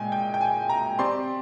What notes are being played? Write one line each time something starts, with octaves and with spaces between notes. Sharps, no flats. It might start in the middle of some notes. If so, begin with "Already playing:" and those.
Already playing: A#2 G#3 G5 G#5
G5
G5
G#5
A#5
C4 G4 D5 C6